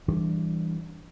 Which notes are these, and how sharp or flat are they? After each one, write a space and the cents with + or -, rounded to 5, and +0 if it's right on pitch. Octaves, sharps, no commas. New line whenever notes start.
E3 +0 G3 +0 D4 -10